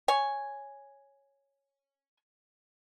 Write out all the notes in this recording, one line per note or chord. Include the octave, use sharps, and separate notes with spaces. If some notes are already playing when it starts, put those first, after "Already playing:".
C#5 G#5